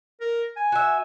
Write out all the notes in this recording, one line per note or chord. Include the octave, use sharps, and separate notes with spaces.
A#4
G#5
F#4 E5